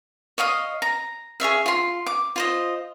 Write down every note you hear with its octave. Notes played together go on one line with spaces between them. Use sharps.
C#5 D#5 F5 D#6
A#5
G#4 C#5 E5 F5
F4 C6
D6
F4 C5 D#5